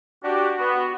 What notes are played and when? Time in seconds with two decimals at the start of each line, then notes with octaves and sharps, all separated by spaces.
0.23 D4 F#4 G4
0.59 B3